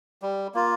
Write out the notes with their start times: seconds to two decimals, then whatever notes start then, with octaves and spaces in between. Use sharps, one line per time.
0.22 G3
0.54 A#3 F4